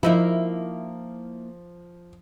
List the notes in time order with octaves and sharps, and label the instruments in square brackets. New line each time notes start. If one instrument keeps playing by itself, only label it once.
[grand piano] F3 [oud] A#3 D#4 E4